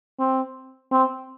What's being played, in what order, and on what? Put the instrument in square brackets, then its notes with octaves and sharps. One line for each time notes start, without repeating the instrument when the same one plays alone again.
[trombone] C4
C4